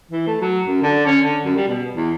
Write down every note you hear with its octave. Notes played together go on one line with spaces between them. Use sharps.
E3
A3
F#3
F#2
D3
C#4
D3
F#2
G3
B2
E2